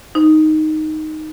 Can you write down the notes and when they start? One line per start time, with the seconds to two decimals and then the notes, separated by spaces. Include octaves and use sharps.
0.15 D#4